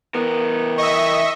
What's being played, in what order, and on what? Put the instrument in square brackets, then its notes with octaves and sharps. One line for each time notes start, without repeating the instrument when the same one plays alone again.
[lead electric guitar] E3 A#4 [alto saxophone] B3
[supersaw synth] D#5 E5 [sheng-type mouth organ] C#6